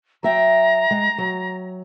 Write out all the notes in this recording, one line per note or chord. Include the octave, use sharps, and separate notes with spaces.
F#3 E5 G5 A#5
G#3
F#3